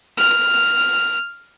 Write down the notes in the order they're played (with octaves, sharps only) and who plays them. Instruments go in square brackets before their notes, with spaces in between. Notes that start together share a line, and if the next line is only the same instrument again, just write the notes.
[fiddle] F6